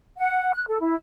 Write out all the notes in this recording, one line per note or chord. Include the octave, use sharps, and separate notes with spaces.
F#5
F#6
A4
E4